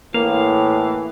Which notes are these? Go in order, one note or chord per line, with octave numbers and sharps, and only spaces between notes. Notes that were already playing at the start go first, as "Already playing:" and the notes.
A2 E3 A#3 F5